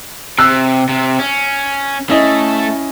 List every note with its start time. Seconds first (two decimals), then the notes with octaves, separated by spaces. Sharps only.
0.39 C3 E6 F#6
0.89 C3
1.19 C#4
2.09 A3 C#4 E4 D#5